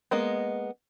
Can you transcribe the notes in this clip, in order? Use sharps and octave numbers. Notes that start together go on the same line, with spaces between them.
G#3 A#3 B3 D#5